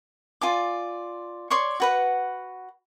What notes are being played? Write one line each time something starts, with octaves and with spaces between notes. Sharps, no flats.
F4 D5 G#5 D6
C#5 D5 C6 C#6
F#4 B4 F#5